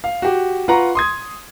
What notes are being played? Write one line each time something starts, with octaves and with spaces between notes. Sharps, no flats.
F5
F#4 G4
F4 B4 F#5 A#5 C#6
C6 D#6 G#6